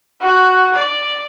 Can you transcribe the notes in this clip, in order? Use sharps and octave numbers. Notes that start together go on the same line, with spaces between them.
F#4 F#6
D5